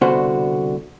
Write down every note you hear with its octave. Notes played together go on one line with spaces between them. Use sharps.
C2 B2 D3 F#4 C5